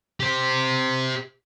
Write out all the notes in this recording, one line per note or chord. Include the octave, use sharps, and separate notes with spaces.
G4 C5